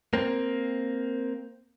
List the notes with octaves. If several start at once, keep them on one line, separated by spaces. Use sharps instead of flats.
A#3 C4